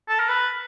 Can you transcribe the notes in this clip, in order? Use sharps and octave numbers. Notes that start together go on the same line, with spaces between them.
A4
A#4
B4